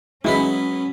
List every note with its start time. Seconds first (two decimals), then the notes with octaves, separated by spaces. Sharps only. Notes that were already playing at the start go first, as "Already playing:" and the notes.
0.24 F#3 G#3 B3 C#4 D#4 E4 B5